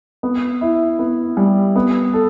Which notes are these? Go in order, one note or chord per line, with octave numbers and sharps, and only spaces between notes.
B3
E4
B3
G3
B3
A4